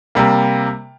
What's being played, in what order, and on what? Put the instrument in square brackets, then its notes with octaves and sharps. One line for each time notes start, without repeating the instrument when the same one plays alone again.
[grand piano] C3 G3 A#3